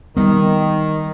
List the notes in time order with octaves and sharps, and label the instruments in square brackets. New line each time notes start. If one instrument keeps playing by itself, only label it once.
[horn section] D#3 [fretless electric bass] G3 B3